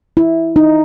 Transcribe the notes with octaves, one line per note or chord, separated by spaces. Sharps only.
E4
D#4